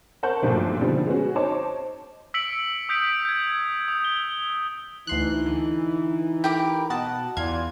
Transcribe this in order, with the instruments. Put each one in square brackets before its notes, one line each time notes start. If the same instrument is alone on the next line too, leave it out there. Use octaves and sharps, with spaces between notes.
[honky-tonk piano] A#4 C5 F#5 A5 C#6 G6
B1 G2 A#2 F3 A3
B2 D3 D#3 F3 G3
G#3 B3 C#4 F#4
D#4 C5 C#5 A5 D6
[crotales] E6 B6 C#7 D7 F#7
D#6 G6 B6 D7
G6 G#6
D#6
G7
[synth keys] D2 C6 F#6 [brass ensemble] E3 D#4
[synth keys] D3
[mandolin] G4 A#4 D6 [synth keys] B5
[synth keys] B2 D#5 A5 [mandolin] F#5
[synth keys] E2 G#6 [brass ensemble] E3 D5 [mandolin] F4